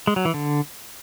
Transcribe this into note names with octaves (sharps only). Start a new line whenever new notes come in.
G#3
F#3
E3
D3